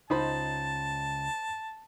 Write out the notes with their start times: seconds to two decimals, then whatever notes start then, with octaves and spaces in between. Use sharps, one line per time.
0.10 C#2 D#4 C5 A5 B5